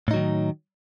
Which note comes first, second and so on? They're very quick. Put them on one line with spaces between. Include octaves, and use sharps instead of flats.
A2 D#4 F#3 D#3